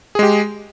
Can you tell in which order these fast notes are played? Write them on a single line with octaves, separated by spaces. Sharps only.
G#4 G#3 G4